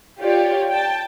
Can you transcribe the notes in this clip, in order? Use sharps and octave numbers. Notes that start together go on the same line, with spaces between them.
F4 G4 C#5 D5
G5 A5